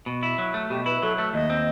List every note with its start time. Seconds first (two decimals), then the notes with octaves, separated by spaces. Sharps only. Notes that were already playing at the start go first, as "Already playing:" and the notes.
0.06 B2
0.23 E4
0.38 F#3
0.54 A3
0.70 B2 G4
0.86 E4 B4
1.02 F#3 A4
1.18 A3 E5
1.34 D#2 D#5
1.50 C4